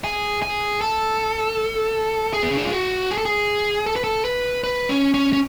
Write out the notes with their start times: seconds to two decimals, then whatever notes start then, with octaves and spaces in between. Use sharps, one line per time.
0.04 G#4
0.42 G#4
0.81 A4
2.33 G#4
2.43 B3
2.51 C#4
2.57 D4
2.65 F4
2.73 F#4
3.11 G#4
3.18 A4
3.25 G#4
3.86 A4
3.96 B4
4.04 A4
4.25 B4
4.64 B4
4.89 C#4
5.14 C#4
5.33 C#4